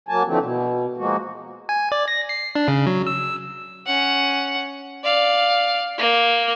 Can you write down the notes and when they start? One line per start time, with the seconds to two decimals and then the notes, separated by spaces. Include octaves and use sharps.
0.09 F#3 A#3 G#5 A5
0.25 D3 E3 F3 A3 C4
0.40 B2
0.97 F3 G#3 A#3 F#4
1.69 G#5
1.92 D5
2.08 A#6
2.29 C7
2.55 D4
2.68 C#3
2.87 F#3
3.07 E6
3.86 C#4 F#5
5.04 D5 F5
5.98 A#3